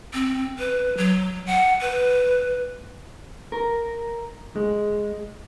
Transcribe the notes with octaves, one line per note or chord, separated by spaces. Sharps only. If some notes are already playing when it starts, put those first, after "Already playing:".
C4
B4
F#3
F#5
B4
A#4
G#3